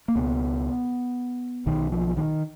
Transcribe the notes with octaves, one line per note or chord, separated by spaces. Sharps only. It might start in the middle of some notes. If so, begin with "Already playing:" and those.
A#3
C#2 B2 B3
B1 B2 D#3
F3
D#3